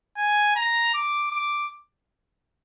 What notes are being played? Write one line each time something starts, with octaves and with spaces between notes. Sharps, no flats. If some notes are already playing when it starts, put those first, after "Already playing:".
G#5
A#5
D6
D6